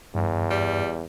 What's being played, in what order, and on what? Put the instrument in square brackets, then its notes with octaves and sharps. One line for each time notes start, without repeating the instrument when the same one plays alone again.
[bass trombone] E2 [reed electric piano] G2
[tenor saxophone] G3